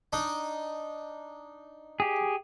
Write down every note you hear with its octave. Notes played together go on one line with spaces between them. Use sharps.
D4 D#4
G4 G#4